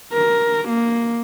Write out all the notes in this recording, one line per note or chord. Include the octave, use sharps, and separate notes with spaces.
A#4
A#3